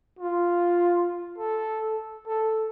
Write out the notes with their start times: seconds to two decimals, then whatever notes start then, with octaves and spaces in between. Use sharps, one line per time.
0.19 F4
1.38 A4
2.27 A4